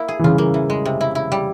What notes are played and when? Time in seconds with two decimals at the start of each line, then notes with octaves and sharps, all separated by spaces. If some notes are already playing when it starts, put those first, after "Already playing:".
Already playing: A#3 E4
0.08 G#4
0.19 E3
0.24 C#3 F4
0.38 A#3
0.54 E3
0.70 G#3
0.85 C3
1.01 E4
1.15 E4
1.32 G3